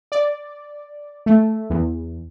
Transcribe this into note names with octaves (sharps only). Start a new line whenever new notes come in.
D5
A3
E2